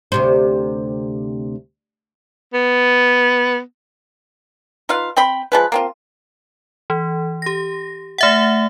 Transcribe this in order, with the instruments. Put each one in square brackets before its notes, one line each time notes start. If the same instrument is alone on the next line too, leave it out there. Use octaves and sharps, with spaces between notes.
[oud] D2 C3 C5
[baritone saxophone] B3
[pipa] D#4 F4 B4 F5
C4 G5 B5
F3 G#3 B4
A#3 C4 F4
[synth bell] E3
G4 A#6
A3 E5 F#5